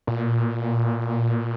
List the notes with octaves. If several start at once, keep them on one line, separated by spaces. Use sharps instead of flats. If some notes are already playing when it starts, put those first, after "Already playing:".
A#2